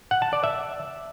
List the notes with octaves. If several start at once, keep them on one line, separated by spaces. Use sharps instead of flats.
F#5
A5
D5
E5